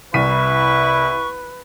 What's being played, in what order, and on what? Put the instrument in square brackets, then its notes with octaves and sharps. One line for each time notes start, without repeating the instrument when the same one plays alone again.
[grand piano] C2 B6 D#7 [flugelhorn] E4 [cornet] B4 [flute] C#6